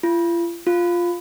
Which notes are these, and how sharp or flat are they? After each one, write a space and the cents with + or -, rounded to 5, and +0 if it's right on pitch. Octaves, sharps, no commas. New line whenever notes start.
F4 -40
F4 +0